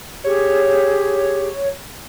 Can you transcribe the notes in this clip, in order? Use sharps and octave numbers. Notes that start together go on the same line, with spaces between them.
G4 G#4 C#5